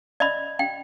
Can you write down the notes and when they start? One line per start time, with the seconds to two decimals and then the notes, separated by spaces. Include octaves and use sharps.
0.20 D5 D#5 B5
0.59 G5